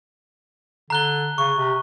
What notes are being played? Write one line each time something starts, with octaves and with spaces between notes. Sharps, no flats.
D3 A#5 F#6 G7
C#3 C#6
C3